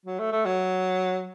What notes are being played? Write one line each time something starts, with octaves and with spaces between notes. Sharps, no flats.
F#3
A3
A3
F#3